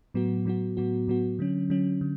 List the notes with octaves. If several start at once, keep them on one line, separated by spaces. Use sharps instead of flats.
A2 F#3 B3 F#4
A2 F#3 B3 F#4
A2 F#3 B3 F#4
A2 F#3 B3 F#4
D3 F#3 C#4
D3 F#3 C#4
D3